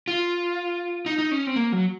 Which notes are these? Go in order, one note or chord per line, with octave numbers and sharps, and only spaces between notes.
F4
D#4
D#4
C#4
C4
A#3
F#3